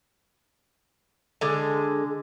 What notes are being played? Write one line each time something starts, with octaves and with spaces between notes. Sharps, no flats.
D3 G#3